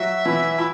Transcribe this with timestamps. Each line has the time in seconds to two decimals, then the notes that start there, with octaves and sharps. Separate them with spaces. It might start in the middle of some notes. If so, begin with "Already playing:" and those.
Already playing: F#3 F#4 E5
0.25 E3 E4
0.58 E4